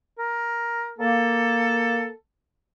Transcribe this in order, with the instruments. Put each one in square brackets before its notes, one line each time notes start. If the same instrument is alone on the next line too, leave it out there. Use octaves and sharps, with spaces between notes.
[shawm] A#4
[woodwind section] A#3 [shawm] A4